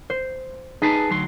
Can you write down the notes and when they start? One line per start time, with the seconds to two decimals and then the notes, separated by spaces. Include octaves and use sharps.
0.10 C5
0.82 D#4 G#4 B4 A5
1.09 D2 F#3 C6